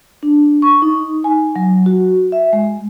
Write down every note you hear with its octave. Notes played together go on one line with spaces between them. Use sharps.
D4
C#6
D#4
G#5
F#3
F#4
E5
G#3